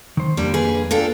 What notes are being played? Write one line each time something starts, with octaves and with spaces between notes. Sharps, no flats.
D#3 C5
F2 G3 A#3 D4
G#4 B4
A#3 D4 F4 A4 G5